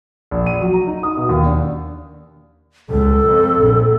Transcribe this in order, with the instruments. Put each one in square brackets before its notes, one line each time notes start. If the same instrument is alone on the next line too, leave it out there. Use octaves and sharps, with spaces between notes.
[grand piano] A#1
D#7
F#3
A#5
D#4
D#6
B2
D#2
D4
[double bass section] C#2 [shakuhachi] A4
[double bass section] F2
A#1